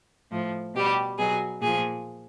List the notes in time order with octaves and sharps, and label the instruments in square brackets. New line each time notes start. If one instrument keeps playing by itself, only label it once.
[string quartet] A2 F3
B2 G3 G4
B2 F#3 G#4
A#2 F3 G#4